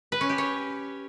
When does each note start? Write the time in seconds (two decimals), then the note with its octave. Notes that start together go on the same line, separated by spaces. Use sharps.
0.12 B4
0.21 C#4
0.29 G4
0.38 C#5